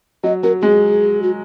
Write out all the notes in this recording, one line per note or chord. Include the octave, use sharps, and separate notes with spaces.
F#3 D#5
F#3 A#4
G#3 G#4
F#4